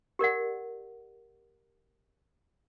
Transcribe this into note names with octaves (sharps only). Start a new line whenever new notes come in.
G4 A#4 D5 F#5